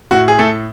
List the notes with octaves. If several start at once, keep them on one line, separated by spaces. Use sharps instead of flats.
A2 F#4
G#4
A2 A3 A4